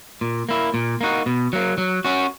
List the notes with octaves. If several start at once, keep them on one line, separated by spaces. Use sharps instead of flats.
A#2
A#3 E4
A#2
A#3 D#4 F#4
B2
F#3 A#3
F#3
C#4 F#4